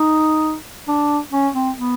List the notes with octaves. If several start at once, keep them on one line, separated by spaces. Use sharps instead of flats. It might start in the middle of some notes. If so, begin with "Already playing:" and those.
Already playing: D#4
D4
C#4
C4
B3